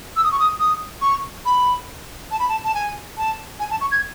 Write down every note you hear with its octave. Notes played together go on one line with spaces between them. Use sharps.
E6
D#6
C#6
D#6
D#6
C#6
B5
A5
B5
A5
A5
G#5
A5
G#5
A5
C#6
G#6